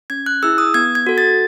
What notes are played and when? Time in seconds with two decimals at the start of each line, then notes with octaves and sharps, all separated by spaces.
0.10 C#4 G#6
0.26 F#6
0.43 E4 G#4 E6
0.58 D#6
0.74 B3 G#6
0.95 G#6
1.07 F#4 A4
1.18 A6